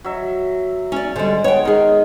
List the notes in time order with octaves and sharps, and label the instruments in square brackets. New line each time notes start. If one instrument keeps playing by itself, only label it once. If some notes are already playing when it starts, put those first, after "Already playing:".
[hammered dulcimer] F#3 E5
[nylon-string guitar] C#4 D5
[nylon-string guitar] D3 G3 [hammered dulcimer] G#3 C5
[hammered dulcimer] B3 [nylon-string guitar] C#5 G5
[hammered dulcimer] D#3 [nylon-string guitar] D#4 G#4